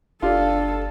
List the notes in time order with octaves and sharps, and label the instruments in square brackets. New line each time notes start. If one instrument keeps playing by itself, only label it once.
[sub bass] F#1 [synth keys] D4 G4 D5 [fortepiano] F4 [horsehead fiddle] A4